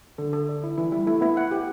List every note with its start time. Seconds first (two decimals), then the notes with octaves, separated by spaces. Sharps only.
0.18 D3 A4
0.33 A4
0.49 D5
0.64 E4
0.78 E3 E4
0.92 G3 E4
1.07 A3 E4
1.21 B3 E4
1.37 F#5
1.51 G4